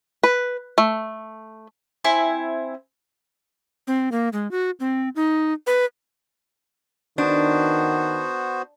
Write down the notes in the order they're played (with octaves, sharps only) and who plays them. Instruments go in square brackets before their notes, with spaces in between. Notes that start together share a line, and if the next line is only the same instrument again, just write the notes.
[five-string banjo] B4
A3
[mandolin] C4 E4 G#5
[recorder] C4
A#3
G#3
F#4
C4
D#4
B4
[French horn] D#3 [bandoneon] B3 F#4 C5 [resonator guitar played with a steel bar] D4